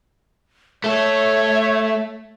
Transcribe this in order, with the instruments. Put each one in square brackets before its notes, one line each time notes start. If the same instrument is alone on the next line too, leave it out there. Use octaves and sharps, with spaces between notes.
[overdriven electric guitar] A3 A4 [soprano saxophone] C#5 [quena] E5